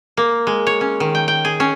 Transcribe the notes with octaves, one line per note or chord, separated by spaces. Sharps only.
A#3
G#3
C#5
C#4
D#3
G5
G5
G#4
C#4